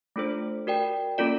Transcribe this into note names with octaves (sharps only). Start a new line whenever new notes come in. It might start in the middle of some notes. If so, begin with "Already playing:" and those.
A3 D4 F4 A4 C5
F#4 A#4 D5 G5
A#3 C#4 F4 A4 D5